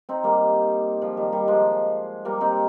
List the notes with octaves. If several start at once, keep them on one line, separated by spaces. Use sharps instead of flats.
C4 D#4
G3 A#3
F3 G#3
D#3 G3
D#3 G3
F3 G#3
G3 A#3
C4 D#4